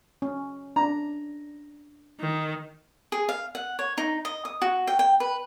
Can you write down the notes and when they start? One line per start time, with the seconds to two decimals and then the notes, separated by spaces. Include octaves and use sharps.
0.22 C#4
0.76 D4 A#5
2.20 D#3
3.12 G#4
3.29 F5
3.55 F#5
3.79 C#5
3.98 D#4
4.25 D#5
4.45 D#6
4.62 F#4
4.87 G5
4.99 G5
5.20 B4